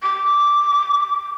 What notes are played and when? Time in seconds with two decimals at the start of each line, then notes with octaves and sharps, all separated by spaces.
0.03 D6